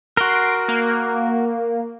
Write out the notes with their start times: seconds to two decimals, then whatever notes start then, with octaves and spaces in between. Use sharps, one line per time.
0.17 F#4 A#4 C6 D7
0.68 A#3